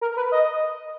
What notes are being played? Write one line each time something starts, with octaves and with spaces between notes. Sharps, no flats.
A#4
B4
D#5